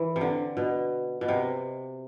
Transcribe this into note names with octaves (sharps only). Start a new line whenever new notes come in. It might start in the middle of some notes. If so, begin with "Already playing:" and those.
Already playing: E3
C3
D3
B2
B2
C3